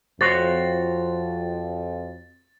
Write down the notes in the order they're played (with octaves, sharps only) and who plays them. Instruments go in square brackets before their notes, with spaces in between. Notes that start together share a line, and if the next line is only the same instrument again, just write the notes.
[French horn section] F2 [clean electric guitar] F#4 C5 C#5 [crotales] A6